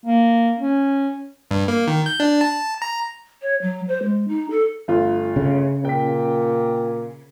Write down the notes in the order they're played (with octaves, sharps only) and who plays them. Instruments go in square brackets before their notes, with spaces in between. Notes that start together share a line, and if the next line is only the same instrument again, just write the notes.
[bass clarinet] A#3
C#4
[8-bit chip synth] G2
A#3
D#3
G6
D4
A5
A#5
[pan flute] C#5
F#3
C5
G#3
D#4
A4
[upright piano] G1 A3 F4
[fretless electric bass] C#3
[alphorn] A#2 [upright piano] G5 B6